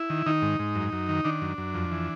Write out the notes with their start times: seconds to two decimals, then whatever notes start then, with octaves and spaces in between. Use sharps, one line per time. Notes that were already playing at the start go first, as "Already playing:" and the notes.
Already playing: E4
0.10 D#3
0.26 D#3 D#4
0.42 G#2
0.59 G#2
0.75 F#2
0.92 F#2
1.09 D#3
1.25 D#3 D4
1.42 F#2
1.58 F#2
1.74 F2
1.92 E3